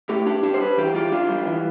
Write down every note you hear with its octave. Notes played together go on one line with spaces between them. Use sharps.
A2 G4
D4 G4
D4 G4
C5
G3 B4
E3 G4
F4 G4
D4 F4
G3
E3